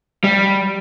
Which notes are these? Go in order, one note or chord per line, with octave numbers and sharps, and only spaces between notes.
G3